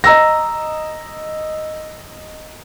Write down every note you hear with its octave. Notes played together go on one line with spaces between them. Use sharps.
D#5 A#5 E6 A#6